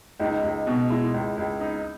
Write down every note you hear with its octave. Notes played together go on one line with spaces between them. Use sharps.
C#2 D#4
C#2
B2
G#3 E4
C#2
C#2
D#4